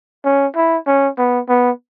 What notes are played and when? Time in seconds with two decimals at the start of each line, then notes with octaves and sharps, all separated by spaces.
0.25 C#4
0.56 E4
0.86 C#4
1.18 B3
1.49 B3